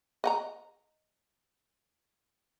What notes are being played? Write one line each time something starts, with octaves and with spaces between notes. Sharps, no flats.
D#5 F#5 A#5